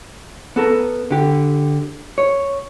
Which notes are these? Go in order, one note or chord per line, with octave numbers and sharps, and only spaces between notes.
B3 A4 A#4
D3 G4
C#5